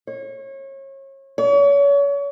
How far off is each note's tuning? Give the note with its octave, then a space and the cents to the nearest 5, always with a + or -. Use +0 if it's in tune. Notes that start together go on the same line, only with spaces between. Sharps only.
C#5 -35
C#5 +35